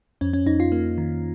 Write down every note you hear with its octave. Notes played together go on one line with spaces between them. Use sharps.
F2 C#4
C#4
F2 D#4
F4
A#3
D#3